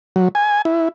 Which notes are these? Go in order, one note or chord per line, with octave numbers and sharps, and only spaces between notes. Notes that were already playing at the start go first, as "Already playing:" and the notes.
F#3
G#5
E4